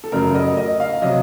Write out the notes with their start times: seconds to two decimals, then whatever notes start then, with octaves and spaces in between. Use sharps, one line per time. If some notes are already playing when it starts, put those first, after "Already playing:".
0.04 A4
0.12 F#2 C#3 A3 A#4
0.35 D#5
0.57 D#5
0.80 F5
1.02 C3 F#3 D#5